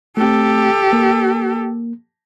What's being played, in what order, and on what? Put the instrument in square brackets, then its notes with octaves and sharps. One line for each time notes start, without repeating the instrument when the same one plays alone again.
[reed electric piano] A3 C4 [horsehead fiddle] G4 A4
[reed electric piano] A#3